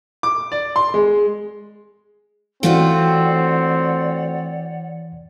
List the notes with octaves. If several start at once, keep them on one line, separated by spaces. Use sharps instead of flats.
D6
D5
C6
G#3
E3 A3 C4 F4 F#4 C#5 D5 F#5